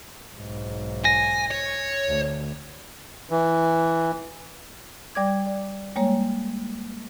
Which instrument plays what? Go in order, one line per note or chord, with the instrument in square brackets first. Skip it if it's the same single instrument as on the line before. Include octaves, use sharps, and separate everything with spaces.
[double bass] B1 G#2
[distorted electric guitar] G#5 [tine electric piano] A#6
[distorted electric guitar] C#5
[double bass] D2
[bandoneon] E3
[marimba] G3 D5 D6 G#6
D5
G3 G#3 A#3 C#5